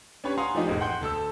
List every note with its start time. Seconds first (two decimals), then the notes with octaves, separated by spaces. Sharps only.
0.24 C#4 D4 G4 B4 C#5
0.38 F5 F#5 G#5 A#5 C6 D#6
0.55 F3 A3 D4 D#4 G4 D#5
0.67 E1 A1 A2 G#4
0.80 F#5 G5 C6 G6
1.01 D2 A4 E6